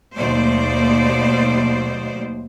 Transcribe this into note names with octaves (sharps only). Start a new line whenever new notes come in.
D#2 B2 F#3 A3 C5 D5